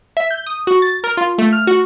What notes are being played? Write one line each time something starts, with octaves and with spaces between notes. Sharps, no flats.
E5
G6
D#6
F#4
A6
A#4
F4
A3
F6
F#4